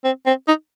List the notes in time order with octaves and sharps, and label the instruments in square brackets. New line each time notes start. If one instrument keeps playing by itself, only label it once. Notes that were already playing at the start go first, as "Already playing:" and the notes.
[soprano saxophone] C4
C4
D#4